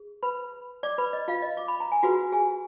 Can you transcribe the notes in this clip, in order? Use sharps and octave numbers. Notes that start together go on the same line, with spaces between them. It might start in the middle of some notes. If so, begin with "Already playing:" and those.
Already playing: G#4
B4 B5
D5 D6
B4 B5
D#5
F4 F5
D#5
D6
B5
A#5
G#5
F4 F#4 G#4 B4 F#5
G#4 G#5